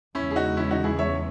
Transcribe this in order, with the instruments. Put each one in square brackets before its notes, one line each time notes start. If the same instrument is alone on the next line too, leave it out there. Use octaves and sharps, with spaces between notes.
[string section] E2 C#3 G#3 [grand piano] C#4 E4
[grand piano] G#4
D#4 F#4
C#4 E4
D#4 F#4
E4 G#4
C#5 E5